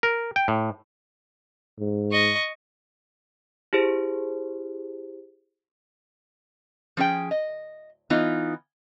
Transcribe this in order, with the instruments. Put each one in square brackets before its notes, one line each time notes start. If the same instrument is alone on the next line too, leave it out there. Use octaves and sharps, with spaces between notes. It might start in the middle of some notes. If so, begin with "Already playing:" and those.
[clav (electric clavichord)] A#4
G5
A2
[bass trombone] G#2
[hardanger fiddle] D#5 C#6
[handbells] E4 G4 G#4 C5
[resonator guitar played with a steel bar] F3 C#4 G#4 G5
D#5
E3 B3 D#4 F4